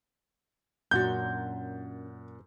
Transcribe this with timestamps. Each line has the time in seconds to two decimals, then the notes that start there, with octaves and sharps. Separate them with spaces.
0.91 F#2 A#2 C#4 D4 F#4 F#5 G6 A6